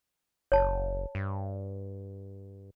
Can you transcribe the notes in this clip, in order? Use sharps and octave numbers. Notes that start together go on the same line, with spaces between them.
F#1 C#5 A5
G2